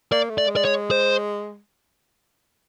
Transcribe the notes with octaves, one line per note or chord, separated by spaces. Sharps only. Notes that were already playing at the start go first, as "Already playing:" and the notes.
A#3 D5
A3
D5
G#3
D5
C#5
C5